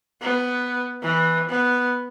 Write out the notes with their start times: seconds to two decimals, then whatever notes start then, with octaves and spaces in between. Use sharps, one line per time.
0.21 B3
1.03 E3
1.49 B3